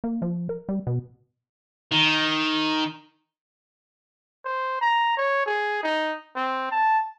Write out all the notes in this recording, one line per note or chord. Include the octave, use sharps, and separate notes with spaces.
A#3
F3
A#4
G3
B2
D#3
C5
A#5
C#5
G#4
D#4
C4
A5